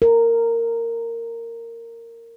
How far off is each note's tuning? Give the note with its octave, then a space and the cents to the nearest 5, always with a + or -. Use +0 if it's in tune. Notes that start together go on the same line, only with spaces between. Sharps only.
A#4 -15